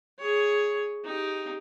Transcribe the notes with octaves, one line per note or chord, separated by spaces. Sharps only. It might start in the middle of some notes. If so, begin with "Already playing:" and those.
G#4 C#5
D#4 G4